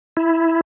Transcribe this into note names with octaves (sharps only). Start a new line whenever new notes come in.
E4